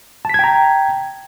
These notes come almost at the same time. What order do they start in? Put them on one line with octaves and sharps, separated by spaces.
A5 B6 G#6 G5 A#5